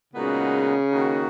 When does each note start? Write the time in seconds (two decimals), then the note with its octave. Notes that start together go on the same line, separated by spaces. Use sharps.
0.13 A#2 C#3 G#3 B3 D#4 F#4
0.91 D#3 A#3 D#4 F#4